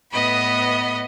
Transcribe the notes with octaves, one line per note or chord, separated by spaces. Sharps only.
A2 B3 B4 D#5 B5